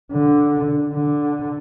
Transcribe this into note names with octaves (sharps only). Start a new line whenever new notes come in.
D3
D3